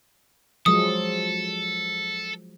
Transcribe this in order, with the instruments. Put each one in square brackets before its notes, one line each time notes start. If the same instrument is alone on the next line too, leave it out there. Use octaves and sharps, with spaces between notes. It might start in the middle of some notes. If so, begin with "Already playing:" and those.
[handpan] F3 F#3 G#3 [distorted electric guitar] A4 [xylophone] D#6